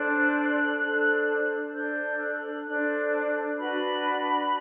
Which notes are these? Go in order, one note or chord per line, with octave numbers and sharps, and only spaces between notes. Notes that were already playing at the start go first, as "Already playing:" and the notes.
Already playing: D4 A4 C5 F#6
D4 A4 C5
D4 A4 C5 G6
F#6
D4 A4 C5
D4 F#4 B4 B5